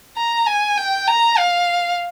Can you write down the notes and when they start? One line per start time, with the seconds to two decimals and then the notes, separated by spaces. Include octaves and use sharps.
0.16 A#5
0.47 G#5
0.77 G5
1.08 A#5
1.38 F5